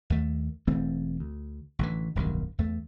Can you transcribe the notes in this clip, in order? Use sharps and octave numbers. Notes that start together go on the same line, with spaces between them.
D#2 A3
E1 E3 A3 C4
D2
A1 D3 E3
D1 B1 G2 D#3
E2 A3